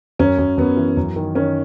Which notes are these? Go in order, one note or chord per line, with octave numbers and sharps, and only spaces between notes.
F#2 C#4
F#2
F#2 B3
E3
F#2
D#3
D#3 C#4